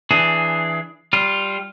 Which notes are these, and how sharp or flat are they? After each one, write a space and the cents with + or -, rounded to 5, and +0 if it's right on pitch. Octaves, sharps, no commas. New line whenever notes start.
E3 +0 D4 +0 G#4 +10
G3 +0 F4 +0